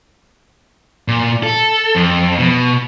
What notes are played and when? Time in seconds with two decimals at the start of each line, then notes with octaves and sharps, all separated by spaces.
1.08 A#2
1.43 A4
1.95 F2
2.39 B2